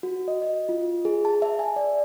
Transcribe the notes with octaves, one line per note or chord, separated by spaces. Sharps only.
F#4
D#5
D#5
F4
G#4
A5
E5
G#5
D5